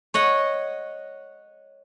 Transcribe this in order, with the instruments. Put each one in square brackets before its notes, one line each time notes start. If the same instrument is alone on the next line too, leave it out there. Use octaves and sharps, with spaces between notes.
[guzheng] C#5 D#5 F#5